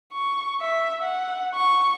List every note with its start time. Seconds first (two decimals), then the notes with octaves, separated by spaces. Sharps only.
0.13 C#6
0.61 E5
1.03 F#5
1.55 C#6